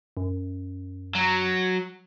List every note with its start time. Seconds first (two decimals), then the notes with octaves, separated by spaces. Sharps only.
0.17 F#2
1.15 F#3